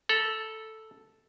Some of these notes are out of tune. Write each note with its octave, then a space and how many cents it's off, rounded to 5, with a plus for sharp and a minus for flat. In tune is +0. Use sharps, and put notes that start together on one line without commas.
A4 +0 A#5 +45